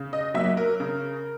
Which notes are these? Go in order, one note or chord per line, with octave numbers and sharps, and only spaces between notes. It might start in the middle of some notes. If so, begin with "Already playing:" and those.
Already playing: C#3
D#5
F#3 A#3 E5
A#4
C#3